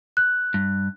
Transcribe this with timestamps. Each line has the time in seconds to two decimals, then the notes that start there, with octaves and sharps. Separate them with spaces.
0.17 F#6
0.54 G2